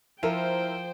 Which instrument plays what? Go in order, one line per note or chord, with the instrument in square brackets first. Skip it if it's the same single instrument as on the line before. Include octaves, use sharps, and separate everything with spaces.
[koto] F3 [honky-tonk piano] E4 A#4 [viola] C5 G5